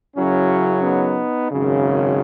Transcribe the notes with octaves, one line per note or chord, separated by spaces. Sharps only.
F#2 C#3 F#3 C#4 E4
B3 D#4
G#1 F#2 C#3